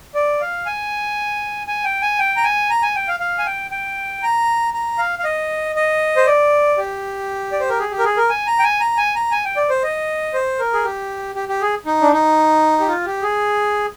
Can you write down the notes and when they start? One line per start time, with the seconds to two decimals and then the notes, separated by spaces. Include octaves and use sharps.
0.15 D5
0.41 F5
0.66 G#5
1.67 G#5
1.84 G5
2.02 G#5
2.19 G5
2.36 A#5
2.44 G#5
2.70 A#5
2.82 G#5
2.96 G5
3.08 F5
3.20 F5
3.38 G#5
3.46 G5
3.71 G5
4.23 A#5
4.74 A#5
4.98 F5
5.19 F5
5.24 D#5
5.76 D#5
6.17 C5
6.26 D5
6.78 G4
7.52 D5
7.60 C5
7.70 A#4
7.79 G#4
7.91 G4
7.99 A#4
8.05 G#4
8.17 A#4
8.29 G#5
8.47 A#5
8.59 G5
8.63 G#5
8.80 A#5
8.97 G#5
9.15 A#5
9.31 G#5
9.45 G5
9.57 D5
9.70 C5
9.83 D#5
10.34 C5
10.59 A#4
10.73 G#4
10.84 G4
11.35 G4
11.49 G4
11.62 G#4
11.86 D#4
12.02 D4
12.12 D#4
12.80 G4
12.88 F4
13.06 G4
13.23 G#4